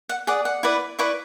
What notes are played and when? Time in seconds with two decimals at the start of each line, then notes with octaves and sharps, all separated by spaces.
0.09 F#5
0.27 G#4 D5 F#5
0.45 F#5
0.63 E4 B4 D5
0.99 E4 B4 D5 C#6